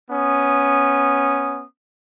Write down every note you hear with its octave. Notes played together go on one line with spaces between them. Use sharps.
B3 C#4 D#6